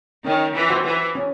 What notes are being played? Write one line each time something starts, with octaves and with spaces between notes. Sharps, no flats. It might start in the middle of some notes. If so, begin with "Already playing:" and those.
D#3 C#4
E3
F#4 C5 F#5
E3
C#4